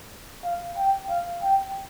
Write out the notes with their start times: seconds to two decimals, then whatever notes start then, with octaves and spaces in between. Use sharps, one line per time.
0.44 F5
0.77 G5
1.10 F5
1.42 G5